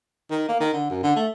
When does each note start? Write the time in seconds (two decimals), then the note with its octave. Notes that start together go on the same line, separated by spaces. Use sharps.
0.31 D#3
0.49 A#3
0.60 D#3
0.73 D3
0.90 F#2
1.03 D3
1.16 A3